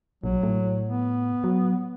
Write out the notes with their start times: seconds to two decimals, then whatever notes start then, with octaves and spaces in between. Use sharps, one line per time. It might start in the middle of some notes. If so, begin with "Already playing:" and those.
0.24 A#1 F#3
0.43 A2
0.89 B3
1.44 F#3